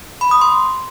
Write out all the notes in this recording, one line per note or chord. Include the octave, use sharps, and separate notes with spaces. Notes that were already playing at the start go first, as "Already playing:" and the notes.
B5
D#6
C6